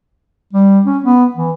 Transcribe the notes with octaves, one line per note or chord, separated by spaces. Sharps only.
G3
C#4
B3
E3